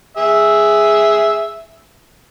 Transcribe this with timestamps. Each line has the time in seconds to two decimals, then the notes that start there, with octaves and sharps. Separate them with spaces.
0.17 G#4 E5